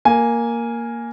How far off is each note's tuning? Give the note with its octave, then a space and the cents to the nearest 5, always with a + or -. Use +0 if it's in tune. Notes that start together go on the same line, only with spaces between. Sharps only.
A#3 +0 G#5 +0